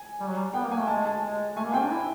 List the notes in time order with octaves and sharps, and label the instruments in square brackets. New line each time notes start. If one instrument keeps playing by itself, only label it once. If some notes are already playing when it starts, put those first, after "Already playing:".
Already playing: [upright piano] G#5
[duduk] G3
F#3
G3
[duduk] B3 [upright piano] G5
[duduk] A#3
[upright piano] G#5
[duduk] A3
[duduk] G#3 [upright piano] A5
[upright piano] A5
[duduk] G#3
[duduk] A3 [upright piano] G#5
[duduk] A#3
[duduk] C4 [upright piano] G5
[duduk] D4
E4